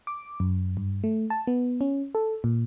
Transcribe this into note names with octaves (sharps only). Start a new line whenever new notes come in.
D6
F#2
G2
A3
A5
B3
C#4
A4
A#2